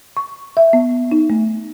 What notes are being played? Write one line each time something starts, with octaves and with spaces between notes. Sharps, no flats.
C#6
E5
B3
D#4
A3